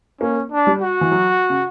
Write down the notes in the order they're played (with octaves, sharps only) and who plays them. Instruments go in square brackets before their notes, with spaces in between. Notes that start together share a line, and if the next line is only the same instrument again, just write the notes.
[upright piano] A#3 [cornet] C#4
[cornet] D4
[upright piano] G3
[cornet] F#4
[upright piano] E3
F#3
C#3